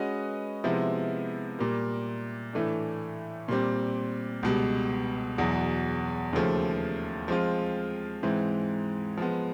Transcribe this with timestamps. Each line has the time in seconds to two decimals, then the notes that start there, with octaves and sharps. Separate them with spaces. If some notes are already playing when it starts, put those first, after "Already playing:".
Already playing: G#3 C#4 F#4 B4 D#5
0.64 C3 F3 G#3 B3 E4
1.59 A#2 G3 A#3
2.53 A2 E3 A3 D4
3.48 A#2 G3 C4
4.43 C#2 B2 G3
5.38 E2 B2 F#3
6.33 D#2 C#3 F3 A3
7.28 F3 G#3 C4 F4
8.23 G#2 E3 G#3 C4
9.17 F3 G#3 B3